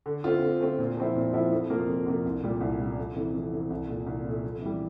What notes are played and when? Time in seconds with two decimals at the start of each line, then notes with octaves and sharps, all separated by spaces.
0.06 D3
0.24 A3 C4 F4
0.42 D3
0.60 A3 C4 F4
0.79 A#2
0.97 F3 C4 E4
1.15 A#2
1.33 F3 C4 E4
1.51 F2
1.70 C3 F3 A#3 F4
1.88 F2
2.06 C3 F3 A#3 F4
2.25 C2
2.43 A#2 G3
2.61 C2
2.79 A#2 G3
2.98 F2
3.16 C3 E3 A3
3.34 F2
3.52 C3 E3 A3
3.70 C2
3.89 A#2 A3
4.07 C2
4.25 A#2 A3
4.44 F2
4.62 E3 G3